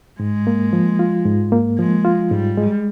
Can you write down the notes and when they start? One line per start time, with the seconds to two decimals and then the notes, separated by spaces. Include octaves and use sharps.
0.20 G#2 G#3
0.47 A#3
0.73 F3
0.99 F4
1.25 G#2
1.52 A#3
1.79 F3 G#3
2.05 F4
2.31 G#2 G3
2.57 G#3